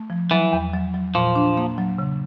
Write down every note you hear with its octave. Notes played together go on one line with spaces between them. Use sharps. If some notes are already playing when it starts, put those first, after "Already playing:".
Already playing: A3
F3
E3 F#3
E2
F#3
F#3
A#2 F3
D4
A#3
F#3
C#3